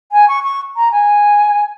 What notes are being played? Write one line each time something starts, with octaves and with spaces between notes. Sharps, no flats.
G#5
C#6
C#6
A#5
G#5